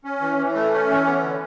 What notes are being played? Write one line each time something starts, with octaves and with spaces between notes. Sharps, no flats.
C#4
E3
E3
A3
C#4
E3
B3
D3